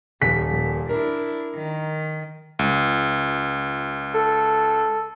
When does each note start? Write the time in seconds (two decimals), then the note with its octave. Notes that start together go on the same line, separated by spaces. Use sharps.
0.21 D#1 F3 B6
0.51 A#2
0.89 D4 E4 A#4
1.55 D#3
2.59 C#2
4.15 A4